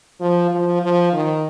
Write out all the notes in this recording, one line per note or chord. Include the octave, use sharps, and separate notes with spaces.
F3
F3
F3
D#3